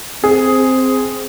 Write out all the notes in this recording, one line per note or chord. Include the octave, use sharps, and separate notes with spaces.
C4 G#4